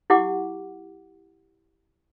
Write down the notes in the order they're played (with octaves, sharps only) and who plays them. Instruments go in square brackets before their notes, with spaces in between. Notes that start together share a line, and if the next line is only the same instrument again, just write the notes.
[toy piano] E4 G4 F#5 D6